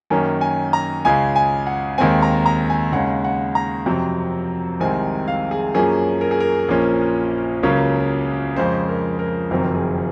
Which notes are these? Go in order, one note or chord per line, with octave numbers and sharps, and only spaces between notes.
F#2 D#3 A#3 C#4 G#5
G#5
A#5
C#2 C#3 G#3 G#5
G#5
F#5
D#2 D#3 G#3 C4 G#5
A#5
A#5
G#5
D#2 C#3 G#3 C#4 F#5
F#5
A#5
F2 C3 F#3 C4
C2 C3 D#3 G#3 C4 G#5
F5
G#4
F#2 F3 A#3 C#4 G#4
A#4
G#4
A#4
A#1 A#2 F3 A#3 C#4
C#2 C#3 F#3 A#3 C#4
F2 C#3 G#3 C5
A#4
A#4
F#1 F2 D#3 F#3 C4 A#4
G#4